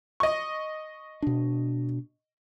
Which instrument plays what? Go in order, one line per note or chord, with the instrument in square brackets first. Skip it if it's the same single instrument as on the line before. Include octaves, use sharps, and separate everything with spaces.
[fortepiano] D#5 C#6
[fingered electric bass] B2 D4